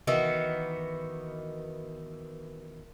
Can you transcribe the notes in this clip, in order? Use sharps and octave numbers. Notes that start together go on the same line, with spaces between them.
D#3 E3 B3 F#4